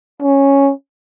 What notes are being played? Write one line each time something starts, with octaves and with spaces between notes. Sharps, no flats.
C#4